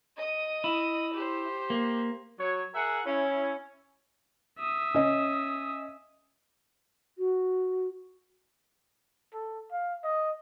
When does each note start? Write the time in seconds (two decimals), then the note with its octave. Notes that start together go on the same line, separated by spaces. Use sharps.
0.17 D#5 D#6
0.64 E4
1.13 G4 C5
1.70 A#3
2.39 F#3 C#5
2.74 G#4 A#4 E5 F#5
3.06 C#4 E4
4.59 E5 D#6
4.94 C#4 D#5
7.18 F#4
9.33 A4
9.72 F5
10.04 D#5